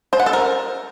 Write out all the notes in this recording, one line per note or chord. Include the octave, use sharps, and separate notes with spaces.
C5
F#5
A4
A#4